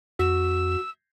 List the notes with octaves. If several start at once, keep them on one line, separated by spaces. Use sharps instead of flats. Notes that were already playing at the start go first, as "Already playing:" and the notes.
F2 F#4 E6